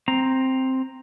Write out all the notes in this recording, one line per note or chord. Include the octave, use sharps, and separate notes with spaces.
C4 A#5